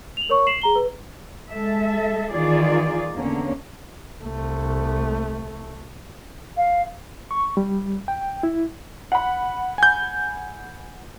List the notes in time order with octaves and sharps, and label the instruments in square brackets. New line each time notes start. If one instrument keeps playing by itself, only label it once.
[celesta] F7 F#7
A#4 C#5 C#6
C7 E7 F#7
G#4 A#5 G7
B4
[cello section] G#3 A4 E5
D#3 E3 F4 G#4 D5
E2 D3 A#3 C#4
[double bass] C2 A3
[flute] F5
[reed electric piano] C#6
G3
G5
E4
[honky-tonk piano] F#5 B5
[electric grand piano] G#5 G6